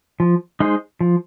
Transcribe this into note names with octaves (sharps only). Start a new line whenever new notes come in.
F3
G#3 D#4 G#4 C5
F3